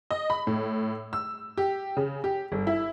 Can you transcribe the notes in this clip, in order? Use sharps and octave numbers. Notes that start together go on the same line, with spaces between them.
D#5
B5
A2
E6
G4
C#3
G4
G1
E4